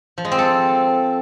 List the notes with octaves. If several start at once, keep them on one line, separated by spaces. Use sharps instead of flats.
F3
G#3
C4
A4